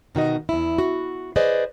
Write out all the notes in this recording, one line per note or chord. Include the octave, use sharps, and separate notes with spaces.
B2 D#3 F#4 D#5
E2 E4
F#4
G#4 B4 C5 D5 D#5